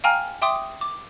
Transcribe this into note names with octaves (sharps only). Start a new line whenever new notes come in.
F5 G5 G#5 A#5 F6
E5 G5 C6 D6 D#6
D6